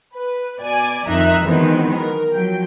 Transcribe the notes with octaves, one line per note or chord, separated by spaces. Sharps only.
B4
B2 D5 G#5
F2 D#3 D#4 E5 A#5 F#6
D#3 E3 F#3 G#3 B3 C4
A#4
F3 F#3 G5